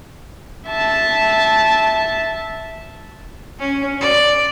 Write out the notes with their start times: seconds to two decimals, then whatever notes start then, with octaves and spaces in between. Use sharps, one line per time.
0.69 E5 A5
3.60 C#4
4.01 D5